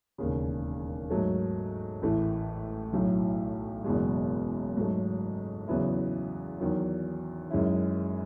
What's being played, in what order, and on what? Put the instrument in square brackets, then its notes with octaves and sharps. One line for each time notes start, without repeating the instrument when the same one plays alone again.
[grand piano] E1 D#2 C#3
G#2 F#3 A3
A1 A2 E3 A3
B1 A2 F#3
F#1 E2 B2 G#3
G#2 F#3 A3
E2 C#3 F#3 B3 E4
E2 D#3 F#3
F#2 D#3 G#3 C#4 E4